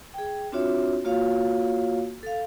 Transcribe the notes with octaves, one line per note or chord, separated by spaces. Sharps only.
G#4 G5
C4 D4 F4 F#4 C#5 E5
A#3 F4 F#4 C#5 F5
A4 F5